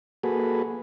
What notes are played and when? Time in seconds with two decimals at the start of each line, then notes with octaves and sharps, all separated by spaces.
0.23 A#3 F#4 G#4 A4 B4